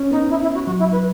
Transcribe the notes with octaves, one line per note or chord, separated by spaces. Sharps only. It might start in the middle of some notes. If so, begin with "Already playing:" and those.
Already playing: C#4
B3 D#4
E4
E4
F#4
F#3 F#4
E4
B4